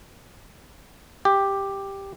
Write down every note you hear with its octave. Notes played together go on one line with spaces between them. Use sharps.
G4